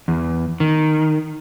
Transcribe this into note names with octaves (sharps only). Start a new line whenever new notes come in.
E2
D#3